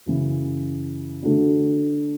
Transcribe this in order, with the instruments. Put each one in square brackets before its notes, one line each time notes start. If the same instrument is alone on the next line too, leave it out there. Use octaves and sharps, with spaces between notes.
[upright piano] F#2 C#3 E3
D3 A3 D4 F#4